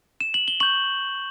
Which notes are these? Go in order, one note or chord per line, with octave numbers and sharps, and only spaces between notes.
E7
F#7
G7
C#6 G6 F#7